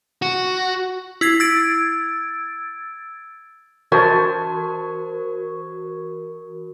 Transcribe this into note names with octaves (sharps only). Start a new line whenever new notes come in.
F#4
E4 G#6 C7
E6 G#6 A6 D7
E3 F#4 A#4 C5 C#5 A5